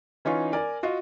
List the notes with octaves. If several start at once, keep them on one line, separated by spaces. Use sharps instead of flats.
E3 C#4 D#4 F4 C#6
A#4 D5 G#5
F4 F#4 D#5